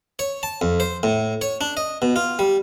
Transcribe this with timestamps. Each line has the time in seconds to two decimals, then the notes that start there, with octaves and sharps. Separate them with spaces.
0.19 C#5
0.43 A5
0.62 F2
0.80 C5
1.03 A2
1.41 C#5
1.61 D4
1.77 D#5
2.02 B2
2.16 F4
2.39 G3